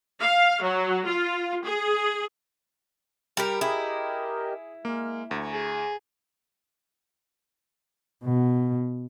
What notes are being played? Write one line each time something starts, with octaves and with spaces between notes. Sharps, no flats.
F5
F#3
F4
G#4
G3 G4 A#4
E4 G4 G#4 A#4 D#5
G#3 A#3 F6
D2 G#5 A#5 C#6
G#4
B2